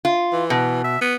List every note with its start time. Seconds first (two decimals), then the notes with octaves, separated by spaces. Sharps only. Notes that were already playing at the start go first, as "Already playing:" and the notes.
0.05 F4
0.32 E3
0.50 B2
0.84 E5
1.01 B3